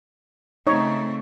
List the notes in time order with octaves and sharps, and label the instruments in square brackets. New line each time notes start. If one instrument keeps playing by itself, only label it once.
[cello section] C#3 A3 C4 [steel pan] D#4 C#5